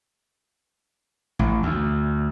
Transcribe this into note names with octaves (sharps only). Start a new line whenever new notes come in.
A1
D2